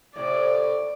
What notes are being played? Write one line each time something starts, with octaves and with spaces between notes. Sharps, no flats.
A2 C3 D5